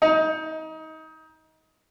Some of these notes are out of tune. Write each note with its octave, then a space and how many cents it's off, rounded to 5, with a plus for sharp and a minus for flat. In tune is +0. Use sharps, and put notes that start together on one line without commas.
D#4 +25